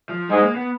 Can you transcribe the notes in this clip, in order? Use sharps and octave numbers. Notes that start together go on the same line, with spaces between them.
F3
G#2 G3 G#3
A#3
B3